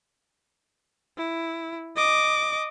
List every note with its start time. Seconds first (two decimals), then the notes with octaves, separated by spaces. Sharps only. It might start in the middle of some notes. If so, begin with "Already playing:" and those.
1.17 E4
1.96 D#5 D6